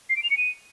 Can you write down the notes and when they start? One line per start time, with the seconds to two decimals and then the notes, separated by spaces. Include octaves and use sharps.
0.10 C7
0.17 D7
0.24 F7
0.30 C#7
0.37 D#7